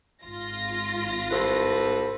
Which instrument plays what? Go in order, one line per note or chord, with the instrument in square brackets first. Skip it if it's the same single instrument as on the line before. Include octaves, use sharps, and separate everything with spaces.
[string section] G#1 F4 A#6
[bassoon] C2 [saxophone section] A4 B4 C5